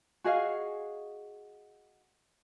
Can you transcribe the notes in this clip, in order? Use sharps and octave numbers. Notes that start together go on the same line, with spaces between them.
F#4 G#4 D#5 F5